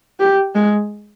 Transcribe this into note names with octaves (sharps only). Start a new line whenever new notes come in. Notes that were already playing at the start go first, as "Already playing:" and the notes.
G4
G#3